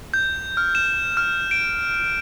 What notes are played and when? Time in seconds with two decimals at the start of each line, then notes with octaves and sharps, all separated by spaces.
0.14 G6
0.57 F6
0.75 E7
1.17 F6
1.51 D7